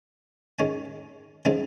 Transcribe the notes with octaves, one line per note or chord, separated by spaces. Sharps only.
D#3 G#3 C#4 G#5
C#3 G#3 C4 D#4 G#5